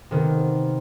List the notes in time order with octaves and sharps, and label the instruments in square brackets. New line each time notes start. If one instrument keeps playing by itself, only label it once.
[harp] C3 D#3 B3